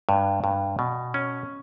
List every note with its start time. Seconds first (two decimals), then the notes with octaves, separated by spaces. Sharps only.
0.09 G2
0.44 G2
0.79 B2
1.14 C#4